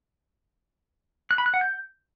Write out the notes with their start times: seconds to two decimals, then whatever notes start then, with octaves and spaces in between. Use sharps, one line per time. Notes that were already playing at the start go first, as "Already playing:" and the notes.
1.31 F#6
1.38 B5
1.46 F#6
1.54 F#5
1.61 G6